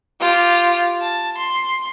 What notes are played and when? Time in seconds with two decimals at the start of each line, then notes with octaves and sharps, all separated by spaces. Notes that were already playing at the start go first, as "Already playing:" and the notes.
0.20 F4 G4
1.01 A5
1.37 C6